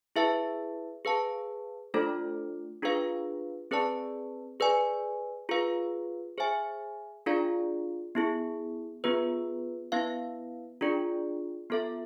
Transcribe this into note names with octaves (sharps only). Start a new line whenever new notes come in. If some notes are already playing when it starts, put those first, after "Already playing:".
E4 G#4 B4 E5 A5
G#4 B4 F5 A5
A3 D4 F4 A4 C5
D4 F4 G#4 B4 F5
C4 G#4 B4 D5 A5
G#4 B4 D5 G#5
F4 G#4 B4 F5
G#4 C5 E5 G#5
D4 F4 G#4 D5 F5
B3 E4 G#4
B3 F4 G#4 B4
B3 E4 B4 F5
D4 F4 G#4 D5
B3 F4 A4 E5